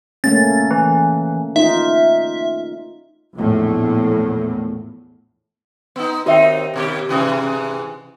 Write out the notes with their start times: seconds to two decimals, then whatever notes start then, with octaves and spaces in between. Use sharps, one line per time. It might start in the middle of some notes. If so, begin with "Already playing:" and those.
0.24 A3 A#3 C#4 A6
0.71 E3
1.56 D#4 F4 E5
3.35 A#1 E2 A2
5.96 B3 D#4
6.26 D#2 C4 D#4 F#4 E5 G5
6.74 D#2 B2 G4
7.09 G#2 C3 E3